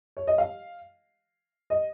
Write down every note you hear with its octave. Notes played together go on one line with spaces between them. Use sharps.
C#5
D#5
F5
D#5